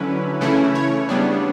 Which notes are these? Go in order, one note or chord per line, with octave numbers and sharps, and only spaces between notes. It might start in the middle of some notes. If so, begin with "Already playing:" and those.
Already playing: D3 F#3 C#4 E4 B4
C#3 E3 A3 C#4 E4
C#5
C#3 G3 B3 D4